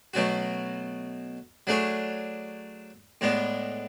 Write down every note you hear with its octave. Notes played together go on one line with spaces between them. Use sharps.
B2 F#3 A3 C#4 F#4
F#3 A3 D4 G#4 C#5
A2 G#3 B3 D4